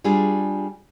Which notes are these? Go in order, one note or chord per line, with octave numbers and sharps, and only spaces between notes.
G3 D4 F4 G#4